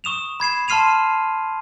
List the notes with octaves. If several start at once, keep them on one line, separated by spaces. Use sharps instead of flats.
C#6 D#6 E7 F7
B5 G#6 C7 E7
A5 C6 F6 C7 D#7 F7